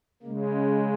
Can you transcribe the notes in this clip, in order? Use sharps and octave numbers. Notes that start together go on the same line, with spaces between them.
C#3 G#3 A#3
C#4